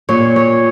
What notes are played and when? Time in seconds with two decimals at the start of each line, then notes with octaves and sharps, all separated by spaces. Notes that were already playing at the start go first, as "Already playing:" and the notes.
0.09 A#2 C#5
0.36 C#5